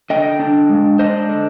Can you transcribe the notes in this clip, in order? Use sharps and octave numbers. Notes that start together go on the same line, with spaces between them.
D3 D#5 G5
D4
G#3
D4 C5 D#5
D3